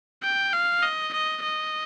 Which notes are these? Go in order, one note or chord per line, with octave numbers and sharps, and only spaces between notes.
G5
F5
D#5
D#5
D#5